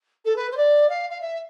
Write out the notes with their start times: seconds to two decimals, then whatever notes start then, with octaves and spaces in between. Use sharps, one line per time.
0.25 A4
0.36 B4
0.51 C5
0.57 D5
0.89 F5
1.09 F5
1.21 E5